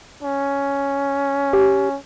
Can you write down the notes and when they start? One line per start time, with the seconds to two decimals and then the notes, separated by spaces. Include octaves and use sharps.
0.23 C#4
1.53 G4